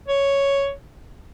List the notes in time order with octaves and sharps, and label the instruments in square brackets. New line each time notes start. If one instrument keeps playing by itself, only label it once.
[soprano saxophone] C#5